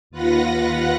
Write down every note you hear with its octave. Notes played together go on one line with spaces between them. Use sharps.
D#2 F4 B4 F#5 A#6